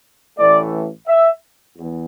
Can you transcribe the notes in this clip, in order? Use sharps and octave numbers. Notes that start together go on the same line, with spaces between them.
A1 A2 E3 A3 D5
E5
E2